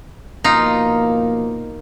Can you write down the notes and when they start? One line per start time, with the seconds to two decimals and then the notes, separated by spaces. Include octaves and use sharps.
0.44 B2 F3 A#3 D#4 F4